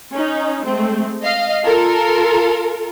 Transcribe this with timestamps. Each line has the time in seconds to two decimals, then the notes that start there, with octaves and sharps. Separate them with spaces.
0.13 C#4 D#4
0.65 G#3 A3 C4
1.23 D#5 F5
1.63 F4 A4 A#4